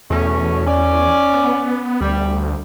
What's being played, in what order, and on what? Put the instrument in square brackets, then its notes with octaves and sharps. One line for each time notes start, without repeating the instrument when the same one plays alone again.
[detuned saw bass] E2 [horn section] B2 A3 C#4
[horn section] C#4 D5
[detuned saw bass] B3
[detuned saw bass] D2 [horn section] G3